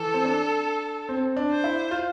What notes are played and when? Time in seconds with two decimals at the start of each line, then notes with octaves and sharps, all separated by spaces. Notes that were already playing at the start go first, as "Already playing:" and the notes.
Already playing: E3 A4
0.14 C4
0.24 D4
1.09 C4
1.37 D4
1.50 C5
1.64 E4
1.91 F4